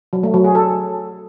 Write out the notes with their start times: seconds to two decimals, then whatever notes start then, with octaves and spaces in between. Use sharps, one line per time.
0.13 F#3
0.23 A3
0.34 F#3
0.44 G#4
0.55 A4